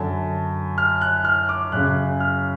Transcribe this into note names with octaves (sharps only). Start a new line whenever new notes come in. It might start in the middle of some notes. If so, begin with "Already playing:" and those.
Already playing: F#2 D3 A5
F6
F#6
F6
D6
F#2 C#3 F#6
F6